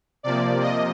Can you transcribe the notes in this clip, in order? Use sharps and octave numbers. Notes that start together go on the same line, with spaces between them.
C3 F3 A#3 D5
D#5